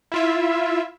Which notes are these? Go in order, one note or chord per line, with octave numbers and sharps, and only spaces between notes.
E4 F4 E5